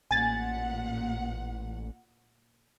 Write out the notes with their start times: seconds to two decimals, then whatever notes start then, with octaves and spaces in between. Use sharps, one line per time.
0.11 A1 A#2 F#5 G#5 A6